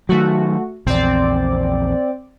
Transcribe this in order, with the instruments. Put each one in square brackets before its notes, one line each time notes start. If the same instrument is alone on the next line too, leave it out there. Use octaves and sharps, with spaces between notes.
[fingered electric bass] D#3 F#3 [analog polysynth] A3 F#4
[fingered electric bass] A#1 E2 [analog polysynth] C4 D5